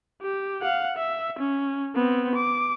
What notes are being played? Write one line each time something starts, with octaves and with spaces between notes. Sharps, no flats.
G4
F5 F#5
E5
C#4
B3 C4
D6